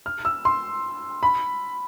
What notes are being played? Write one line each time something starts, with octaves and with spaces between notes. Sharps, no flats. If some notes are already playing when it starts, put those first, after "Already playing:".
F6
E6
C6
B5